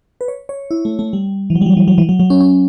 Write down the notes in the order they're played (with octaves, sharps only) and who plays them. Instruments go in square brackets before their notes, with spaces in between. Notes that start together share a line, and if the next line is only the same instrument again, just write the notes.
[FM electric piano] B4
C#5
C#5
E4
A3
A3
G3
E3
F#3
G3
F#3
E3
F#3
E3
F#3
F#3
C#4
C#4